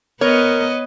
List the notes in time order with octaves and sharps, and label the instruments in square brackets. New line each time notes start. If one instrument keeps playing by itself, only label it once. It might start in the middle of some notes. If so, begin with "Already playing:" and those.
[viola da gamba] B3 B4 D#5 [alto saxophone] A#4 [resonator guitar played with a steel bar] C#5